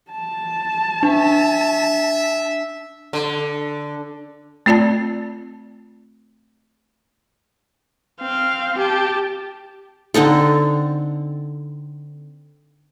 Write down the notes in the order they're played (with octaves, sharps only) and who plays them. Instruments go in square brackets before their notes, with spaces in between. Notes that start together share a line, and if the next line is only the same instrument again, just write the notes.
[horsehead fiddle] A5
[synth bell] D4 [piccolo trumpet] E5
[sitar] D3
[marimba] A3 C4 F4 D5 A5
[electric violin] C4 F5
G4 A5
[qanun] D3 C4 D#4 A4